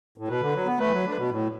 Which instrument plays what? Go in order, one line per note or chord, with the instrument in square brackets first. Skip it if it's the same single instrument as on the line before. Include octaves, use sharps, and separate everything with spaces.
[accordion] A2
[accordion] B2 [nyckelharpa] B4
[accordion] D3
F#3
B3
[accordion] A3 [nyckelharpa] B4
[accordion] E3
F#3
D3
B2
A2